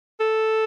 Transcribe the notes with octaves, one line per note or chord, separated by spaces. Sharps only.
A4